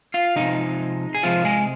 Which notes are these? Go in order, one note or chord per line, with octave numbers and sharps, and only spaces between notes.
F4 F5
C3 D#3 F3 G#3 D#4
G#4
C3 F3 G#3 F4
G#3 G#4